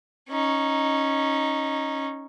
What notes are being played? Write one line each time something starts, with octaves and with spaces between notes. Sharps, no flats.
C#4 D#4